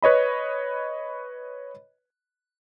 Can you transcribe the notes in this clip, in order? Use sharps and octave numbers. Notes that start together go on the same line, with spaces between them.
B4 C#5 D#5 B5